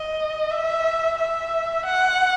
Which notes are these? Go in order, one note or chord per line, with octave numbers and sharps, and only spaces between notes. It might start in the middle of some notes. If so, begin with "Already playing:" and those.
Already playing: D#5
E5
E5
F#5